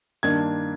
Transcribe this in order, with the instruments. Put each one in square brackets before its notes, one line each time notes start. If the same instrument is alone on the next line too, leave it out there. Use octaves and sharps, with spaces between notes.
[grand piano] G2 D#3 A#3 D4 G#6